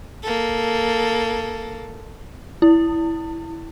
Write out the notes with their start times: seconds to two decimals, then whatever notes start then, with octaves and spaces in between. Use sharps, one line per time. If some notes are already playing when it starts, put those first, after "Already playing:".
0.23 A#3 A4
2.62 E4